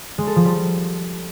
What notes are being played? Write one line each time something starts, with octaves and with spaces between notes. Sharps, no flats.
G#3
A4
F3
G3